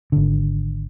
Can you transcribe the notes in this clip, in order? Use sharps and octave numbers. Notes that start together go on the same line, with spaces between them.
G#1 D3